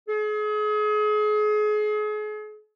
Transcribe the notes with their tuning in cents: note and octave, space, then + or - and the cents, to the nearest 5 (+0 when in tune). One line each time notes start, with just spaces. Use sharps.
G#4 +35